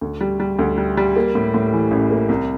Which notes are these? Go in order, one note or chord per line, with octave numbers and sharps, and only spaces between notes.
D2
G3
G3
D2
G3
G3
A#3
A2
A2
E3
A1
A#3
C2